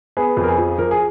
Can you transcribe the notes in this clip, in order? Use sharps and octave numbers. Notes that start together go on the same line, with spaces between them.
B3 G#4
F2
A#4
G#4
F3
F3 A#4
G#4